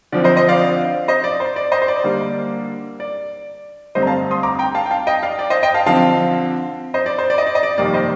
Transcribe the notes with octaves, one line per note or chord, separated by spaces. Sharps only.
D3 F3 C4 D5
C5 D#5
C5 D#5
D5 F5
C5 D#5
D5
C5
D5
C5 D#5
C5
D5
D3 G3 A#3
D5
G2 D3 A3 C4 C5 D#5
A#5
F5 A5
C6 D#6
A#5 D6
G5 A#5
F5 A5
G5
F5 A5
D#5 G5
D5 F5
D5
C5 D#5
D#5 G5
F5 A5
D3 F3 C4 F5 A5
C5 D#5
D5
C5
D5
D#5
D5
D#5
D5
F2 C3 D#3 G3 A#3 D5
C5 D#5